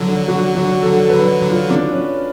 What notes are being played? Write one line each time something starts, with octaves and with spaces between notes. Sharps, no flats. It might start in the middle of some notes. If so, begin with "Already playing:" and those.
Already playing: D3 F#3 A4
F#4
F#4
A4
A4
B4
F4
D4
C#4